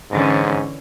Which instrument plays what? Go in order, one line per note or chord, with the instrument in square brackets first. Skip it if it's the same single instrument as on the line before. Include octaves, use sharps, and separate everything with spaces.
[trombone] G#2 [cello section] D3 E3 C#4